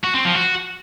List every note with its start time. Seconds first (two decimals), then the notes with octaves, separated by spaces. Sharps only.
0.04 F#4
0.14 C4
0.25 F3
0.35 F#4